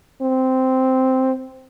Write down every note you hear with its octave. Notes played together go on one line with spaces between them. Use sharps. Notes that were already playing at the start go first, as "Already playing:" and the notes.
C4